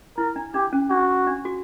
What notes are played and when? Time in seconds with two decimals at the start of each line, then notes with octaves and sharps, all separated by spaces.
0.17 E4 A#4
0.36 D4
0.54 D4 G4
0.73 C#4
0.90 D4 F#4
1.27 D4
1.45 F#4